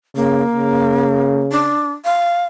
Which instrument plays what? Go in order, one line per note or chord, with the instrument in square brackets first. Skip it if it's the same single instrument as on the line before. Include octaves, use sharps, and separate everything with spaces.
[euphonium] C#3 [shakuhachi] A#3
[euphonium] C#3
[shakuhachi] D4
F5